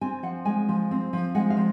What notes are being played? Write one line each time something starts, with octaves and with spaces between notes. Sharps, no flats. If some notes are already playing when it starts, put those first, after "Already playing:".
C4 G#5
F3 F#5
G#3 G#5
F3
C4
F3
G#3 F#5
F5
F3